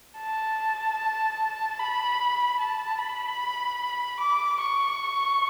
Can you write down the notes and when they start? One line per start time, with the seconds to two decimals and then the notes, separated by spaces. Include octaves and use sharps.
0.18 A5
1.79 B5
2.60 A5
2.99 B5
4.20 D6
4.60 C#6